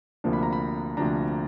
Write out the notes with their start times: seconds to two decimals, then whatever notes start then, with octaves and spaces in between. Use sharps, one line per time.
0.24 D2 C3 F3 A#3 D4
0.33 B5
0.43 A#5
0.53 B5
0.97 D2 C3 F3 A#3 D4 A#5